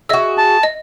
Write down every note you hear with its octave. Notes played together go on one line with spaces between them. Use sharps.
F#4 G#4 D#5 E5 E6
A5
D#5